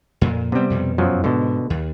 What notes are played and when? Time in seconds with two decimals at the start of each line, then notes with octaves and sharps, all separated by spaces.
0.21 F2 A#2
0.52 C3 G3 B3 C4
0.70 F2 B2
0.98 F#2 F3 F#3
1.24 G#2 B2 D3
1.70 D#2